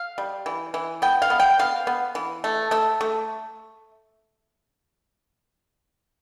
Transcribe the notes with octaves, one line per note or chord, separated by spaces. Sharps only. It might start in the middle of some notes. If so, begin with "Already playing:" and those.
Already playing: F5
G3
E3
E3
B3 G5
F5
B3
G5
B3 F5
B3
E3
A3
A3 E5
A3